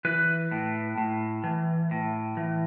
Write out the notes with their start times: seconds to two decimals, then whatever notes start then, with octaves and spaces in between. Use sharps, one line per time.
0.05 E3 B4
0.51 A2
0.98 A2
1.44 E3
1.91 A2
2.37 E3